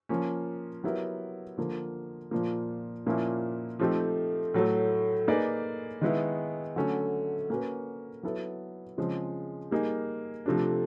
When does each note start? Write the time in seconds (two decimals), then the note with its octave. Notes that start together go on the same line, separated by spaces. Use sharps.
0.09 F3 A#3 C#4
0.84 F#3 B3 E4 G4 A#4
1.58 D3 F3 A#3
2.31 A#2 F3 A#3
3.06 A#2 F3 A#3 C#4 E4
3.79 F3 A3 C4 D#4 G4
4.54 A2 F#3 A3
5.28 A#3 D#4 G#4 B4 D5
6.01 D#3 G#3 B3 E4
6.76 D3 F#3 A3 C#4
7.50 A#3 C#4 F#4 B4
8.23 F#3 B3 E4 A4
8.98 C#3 F3 G#3 C4
9.71 G3 A#3 D#4 G#4
10.46 C3 F3 A3 D4